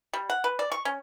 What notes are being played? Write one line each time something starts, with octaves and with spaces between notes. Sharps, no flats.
G3
F#5
B4
D5
C#6
C#4